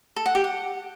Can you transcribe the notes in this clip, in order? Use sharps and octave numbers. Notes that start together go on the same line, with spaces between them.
A4
F#5
G4
F#5